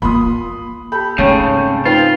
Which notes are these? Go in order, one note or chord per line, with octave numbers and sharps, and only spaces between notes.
A#3 F4 B5 C6 D#6
G4 A4 B5 G6
G#2 C#3 A3 C4 C#5 G5 G6
D#4 F4 B4 C5 G5